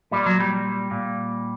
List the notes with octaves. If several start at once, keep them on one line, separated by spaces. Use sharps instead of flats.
A#2 G3
F#3
G3
A#2